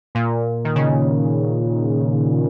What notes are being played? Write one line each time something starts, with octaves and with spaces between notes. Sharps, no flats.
A#2
D#3
C#3